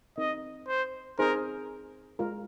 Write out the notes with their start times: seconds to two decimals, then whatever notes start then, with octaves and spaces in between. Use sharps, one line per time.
0.18 C4 D#4 A#4 D#5
0.68 C5
1.19 C4 D#4 G#4 A#4 C5
2.19 G#3 F4 A#4